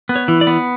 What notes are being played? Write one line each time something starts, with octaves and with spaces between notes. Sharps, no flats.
B3
C#5
E3
D5
B3